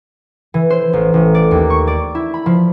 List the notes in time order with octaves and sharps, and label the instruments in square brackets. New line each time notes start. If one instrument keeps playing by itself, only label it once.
[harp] E3
C5
A1
A1
D5
D#2
C#6
D5
E4
B5
F3